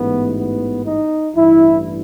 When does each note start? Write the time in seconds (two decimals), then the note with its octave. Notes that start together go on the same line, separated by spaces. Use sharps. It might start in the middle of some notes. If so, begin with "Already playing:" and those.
Already playing: A1 G#2 E3 B3
0.39 B3
0.86 D#4
1.34 A1 G2 E3 E4